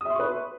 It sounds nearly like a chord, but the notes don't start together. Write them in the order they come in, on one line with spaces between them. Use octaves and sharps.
D#6 E5 C6 C#6 B4